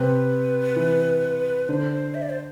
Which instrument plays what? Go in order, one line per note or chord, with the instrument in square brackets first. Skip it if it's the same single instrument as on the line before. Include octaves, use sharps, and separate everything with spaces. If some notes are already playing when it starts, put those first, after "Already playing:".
Already playing: [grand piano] C3 C4 [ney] B4
[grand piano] E3
[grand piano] D3 [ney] C5
[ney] E5
D5
C5